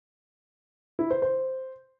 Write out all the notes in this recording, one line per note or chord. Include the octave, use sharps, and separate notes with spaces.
E4
C5
C5